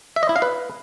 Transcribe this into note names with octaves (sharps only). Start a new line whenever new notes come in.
E5
D#5
E4
F5
B4